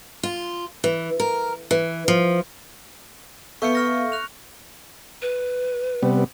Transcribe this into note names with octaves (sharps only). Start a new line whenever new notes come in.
F4
E3
A#4
E3
F3
B3 A4 E5 F5 C#6 G6 C#7
C#6 F6 A#6
F#6 F7
B4
C3 G3 B3